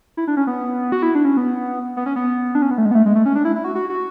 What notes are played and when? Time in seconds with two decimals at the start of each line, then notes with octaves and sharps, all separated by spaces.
0.17 E4
0.28 D4
0.37 C#4
0.47 B3
0.92 F#4
1.03 E4
1.15 D4
1.25 C#4
1.37 B3
1.97 B3
2.06 C#4
2.16 B3
2.55 D4
2.62 C#4
2.71 B3
2.78 A3
2.85 G#3
2.91 B3
2.95 A3
3.06 G#3
3.15 A3
3.26 C#4
3.35 D4
3.45 E4
3.56 E4
3.64 F#4
3.75 F#4
3.90 F#4